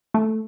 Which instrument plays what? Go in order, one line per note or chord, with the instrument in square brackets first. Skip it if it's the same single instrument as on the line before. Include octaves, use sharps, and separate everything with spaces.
[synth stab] A3